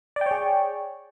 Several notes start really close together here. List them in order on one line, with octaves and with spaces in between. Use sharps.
D5 G5 C#5 G#4